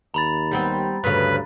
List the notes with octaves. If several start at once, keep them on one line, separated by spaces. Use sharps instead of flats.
D#2 A#5 B5 A6
G3 B3 C4
D2 G2 C#3 B4